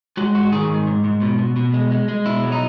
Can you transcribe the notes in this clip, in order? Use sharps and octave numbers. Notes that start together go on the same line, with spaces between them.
G#3 F#4
G#2 F#4
D#3 G#4
G#2
G#2
G#2
B2
B2
B2
G#3
G#3
G#3
B2 E4
F#3
D#4